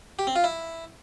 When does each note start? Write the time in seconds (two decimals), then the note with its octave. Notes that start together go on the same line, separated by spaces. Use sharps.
0.19 G4
0.27 C4
0.36 F4
0.44 E4